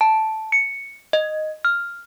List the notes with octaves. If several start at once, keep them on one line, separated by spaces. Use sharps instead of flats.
A5
C#7
D#5
F6